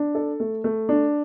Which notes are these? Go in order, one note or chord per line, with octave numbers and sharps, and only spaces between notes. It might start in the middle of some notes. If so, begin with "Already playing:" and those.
Already playing: D4
A4
A3
A3
D4